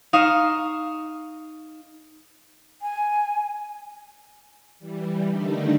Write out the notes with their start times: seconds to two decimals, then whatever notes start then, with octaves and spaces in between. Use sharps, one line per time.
0.13 D#4 F5 C#6 D#6 E7
2.82 G#5
4.79 E3 G3
5.29 D3 D#3 G3 A3 D4 D#4